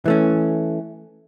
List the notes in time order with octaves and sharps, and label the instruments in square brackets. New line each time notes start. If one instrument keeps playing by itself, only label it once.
[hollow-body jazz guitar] E3 A3 C#4